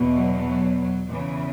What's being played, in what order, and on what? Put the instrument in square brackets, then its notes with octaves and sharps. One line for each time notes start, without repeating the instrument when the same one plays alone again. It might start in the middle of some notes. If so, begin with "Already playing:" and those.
Already playing: [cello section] E2 B2
F#3
F#3
F#3
E2 C#3 E3